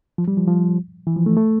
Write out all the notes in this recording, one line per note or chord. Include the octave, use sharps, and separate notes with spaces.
F3
G3
F3
F3
E3
F3
A3
A3